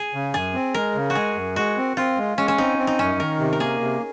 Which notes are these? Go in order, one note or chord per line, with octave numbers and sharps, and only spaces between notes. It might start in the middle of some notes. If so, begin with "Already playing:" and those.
Already playing: G#4
C#3
F#2 G#4
C4
G#3 A#4
C#3
F#4
G#3 G#4
F#2
G#3 F#4
C4
C4 F4
G#3
G#3 C#4
C#4
C4 D#4
C4
D#4
F#2 C#4
D#3 A#4
C3
A#4
A#3 G#4
C3